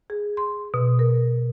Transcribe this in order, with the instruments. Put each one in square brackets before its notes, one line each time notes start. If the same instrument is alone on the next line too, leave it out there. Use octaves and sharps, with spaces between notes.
[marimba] G#4
C6
B2
A#4